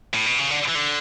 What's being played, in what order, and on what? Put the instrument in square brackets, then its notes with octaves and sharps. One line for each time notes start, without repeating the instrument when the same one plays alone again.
[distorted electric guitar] A2
B2
C#3
D3
E3
D3